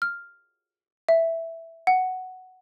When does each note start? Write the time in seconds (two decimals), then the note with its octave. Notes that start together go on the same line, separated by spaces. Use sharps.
0.02 F6
1.09 E5
1.87 F#5